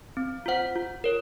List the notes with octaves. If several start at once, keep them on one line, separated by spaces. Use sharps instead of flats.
C4
F4 C5 F#5
F4
A#4 C#5